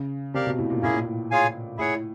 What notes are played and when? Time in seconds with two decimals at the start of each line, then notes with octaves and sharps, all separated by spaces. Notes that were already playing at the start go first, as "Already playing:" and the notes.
Already playing: C#3
0.34 C3 G4 A#4 D5 F5
0.46 B2
0.58 A2
0.70 A#2
0.82 A2 A#3 C#4 E4 G#4
0.93 A#2
1.04 A2
1.31 F4 G#4 C#5 F5 G#5
1.77 A2 E4 G#4 C#5 F#5